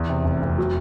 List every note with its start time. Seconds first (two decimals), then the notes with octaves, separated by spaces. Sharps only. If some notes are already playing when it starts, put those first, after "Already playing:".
Already playing: E2
0.09 C3
0.24 F1
0.42 F1
0.58 F#3